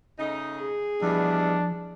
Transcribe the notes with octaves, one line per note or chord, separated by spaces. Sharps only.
C#3 A3 D#4
G#4
E2 B2 F3 G3 D4